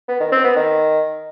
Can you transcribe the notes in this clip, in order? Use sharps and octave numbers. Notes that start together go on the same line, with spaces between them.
B3
D#3
C4
B3
D#3